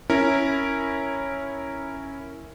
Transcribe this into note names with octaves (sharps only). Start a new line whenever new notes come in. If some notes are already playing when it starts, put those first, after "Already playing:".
C#4 E4 A#4